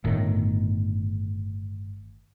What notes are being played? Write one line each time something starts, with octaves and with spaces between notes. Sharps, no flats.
G1 A2 D#3